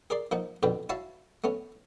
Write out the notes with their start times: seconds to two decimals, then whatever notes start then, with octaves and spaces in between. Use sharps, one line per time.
0.10 G#4 A#4 D5 C6
0.31 F3 A#3 D#4 F#5
0.63 A#1 F2 B2 D3 B4 G5
0.89 E4 F#4 C#5 E5 F5 A5
1.44 A3 B3 C#4